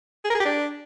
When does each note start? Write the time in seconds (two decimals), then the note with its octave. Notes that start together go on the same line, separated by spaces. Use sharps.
0.25 G#4
0.30 A#4
0.35 G#4
0.40 G4
0.45 D4